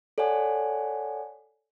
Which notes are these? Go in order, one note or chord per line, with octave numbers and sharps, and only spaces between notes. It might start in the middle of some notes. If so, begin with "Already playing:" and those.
A4 C#5 D5 F#5 G#5